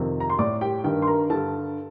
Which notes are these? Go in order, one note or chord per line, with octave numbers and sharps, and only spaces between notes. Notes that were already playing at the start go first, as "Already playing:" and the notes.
Already playing: F2 C3 D#3
A#5
C6
A2 D5 D6
G4 G5
G2 D#3 G4 G5
C6
A#4 A#5
G2 D3 A4 A5